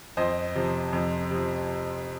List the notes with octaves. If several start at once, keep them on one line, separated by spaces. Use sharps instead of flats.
F2 C5 D#5
C3 F3
F2
C3 F3